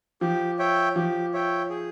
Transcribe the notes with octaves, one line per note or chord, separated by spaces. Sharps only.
F3 G4
C#5 E5 G5
F3 G4
C#5 E5 G5
G#4